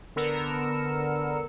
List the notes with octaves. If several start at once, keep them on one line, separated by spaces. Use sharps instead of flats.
D3 B3 A#4 E6 C#7